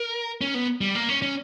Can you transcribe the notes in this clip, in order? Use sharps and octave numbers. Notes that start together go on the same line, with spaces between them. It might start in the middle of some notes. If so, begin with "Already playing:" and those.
Already playing: A#4
C#4
B3
G3
A#3
C#4
C#4